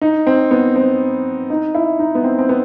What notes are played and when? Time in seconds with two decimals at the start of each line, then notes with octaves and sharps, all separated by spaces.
0.01 D#4
0.27 C4
0.51 B3
0.76 C4
1.50 D#4
1.75 E4
1.99 D#4
2.15 B3
2.24 C4
2.38 C4
2.49 B3